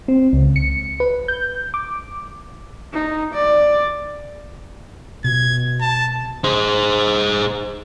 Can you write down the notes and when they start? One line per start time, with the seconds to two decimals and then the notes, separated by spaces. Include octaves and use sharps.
0.08 C4
0.33 C#2
0.56 C#7
1.00 B4
1.28 G6
1.74 D6
2.93 D#4
3.34 D5
5.25 B2 G#6
5.81 A5
6.44 G#4 C5